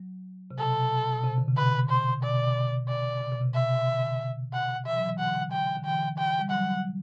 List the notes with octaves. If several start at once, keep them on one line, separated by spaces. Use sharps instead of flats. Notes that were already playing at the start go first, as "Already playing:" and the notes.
Already playing: F#3
C3
B2 A4
B2
C3
D3
C3
B2 B4
C5
B2 D5
D5
C3
B2
C3
E5
D3
F#5
E3 E5
F#3
E3
D3 F#5
G5
D3
E3 G5
G5
G3
F#3 F#5